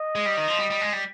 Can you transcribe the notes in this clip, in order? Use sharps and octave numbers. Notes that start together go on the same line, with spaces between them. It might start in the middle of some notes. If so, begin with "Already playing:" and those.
Already playing: D#5
G#3
G3
D#3
F3
G3
G3
G#3
G3